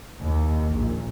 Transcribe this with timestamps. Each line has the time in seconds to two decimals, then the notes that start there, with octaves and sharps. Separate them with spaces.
0.21 D#2
0.74 A#1